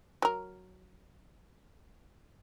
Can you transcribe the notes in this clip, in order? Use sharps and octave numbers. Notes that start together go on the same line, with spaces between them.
F#3 A#4